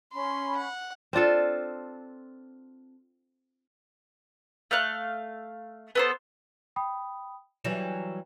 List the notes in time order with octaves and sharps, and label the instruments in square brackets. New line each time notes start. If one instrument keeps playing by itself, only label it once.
[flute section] C#4 B5 [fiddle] C6
[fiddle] F#5
[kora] C4 D4 F4 A4
[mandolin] A3 F5 F6 F#6
B3 A4 C5
[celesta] G5 B5 D#6
[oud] E3 F#3 G3 [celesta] E7